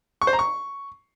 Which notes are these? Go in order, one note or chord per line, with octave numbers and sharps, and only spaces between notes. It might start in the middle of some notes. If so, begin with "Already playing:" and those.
C#6
C5
A#5
C#6